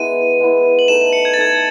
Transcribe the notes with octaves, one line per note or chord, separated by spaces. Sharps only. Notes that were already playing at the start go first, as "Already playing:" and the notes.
Already playing: G#3 B3 E4 D#7
G#3 B3 E4
F#7
A3 D#4 A4 D#5 E7
E7
C#7
G#6
A6
A3 D#4 A4 D#5 G#6